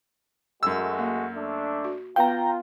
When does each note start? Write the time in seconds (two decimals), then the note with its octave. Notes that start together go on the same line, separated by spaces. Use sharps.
0.63 F#2 G#3 A3 F#4 E6
0.99 A#3
1.35 A3 D4
1.84 F#4
2.16 B3 F4 B4 F5 G5 A#5